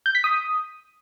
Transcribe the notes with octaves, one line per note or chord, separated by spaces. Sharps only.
G6
B6
D#6